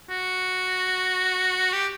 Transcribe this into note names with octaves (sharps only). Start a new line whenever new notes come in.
F#4
G4